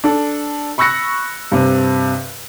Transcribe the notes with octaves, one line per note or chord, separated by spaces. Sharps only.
D4 A4
B5 C#6 E6 F#6 A#6 C#7
G2 C3